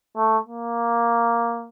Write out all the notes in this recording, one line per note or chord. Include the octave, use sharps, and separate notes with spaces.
A3
A#3